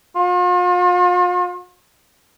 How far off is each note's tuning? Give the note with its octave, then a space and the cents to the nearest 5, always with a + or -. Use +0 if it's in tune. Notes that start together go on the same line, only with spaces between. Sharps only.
F4 +40